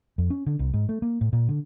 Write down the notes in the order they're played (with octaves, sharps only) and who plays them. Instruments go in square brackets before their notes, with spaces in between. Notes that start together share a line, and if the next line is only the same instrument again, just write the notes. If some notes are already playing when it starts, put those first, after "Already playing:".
[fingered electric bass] F2
C#4
D3
C2
G#2
A3
A#3
A2
A#2
D3